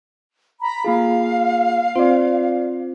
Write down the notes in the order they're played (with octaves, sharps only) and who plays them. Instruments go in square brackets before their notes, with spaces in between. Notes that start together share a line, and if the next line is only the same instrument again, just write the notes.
[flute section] A#5 B5
[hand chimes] A#3 F4 G#4 [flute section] F5
[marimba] C4 F4 C6 [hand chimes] C5 D5